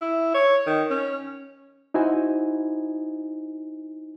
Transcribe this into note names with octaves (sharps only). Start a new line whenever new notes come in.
E4
C#5
D#3
C#4
D#4 E4 F#4 C5 G#5